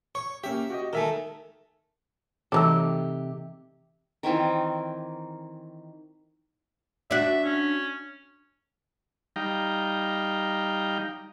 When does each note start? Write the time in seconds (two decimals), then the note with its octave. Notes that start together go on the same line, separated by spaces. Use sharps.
0.15 C#5 C#6
0.44 A#3 C#4 G4 E5
0.70 F#4 G4 D#5
0.93 D#3 A3 A#4 E5 G#5
2.52 C3 E3 A3 D#4 G4 A4 D6 E6
4.23 D#3 E3 C4 F4
7.11 D4 F#4 E5
7.44 C#4
9.36 G3 D#4 F5 G5 A#5